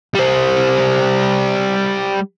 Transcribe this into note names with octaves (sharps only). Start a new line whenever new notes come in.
G3 C5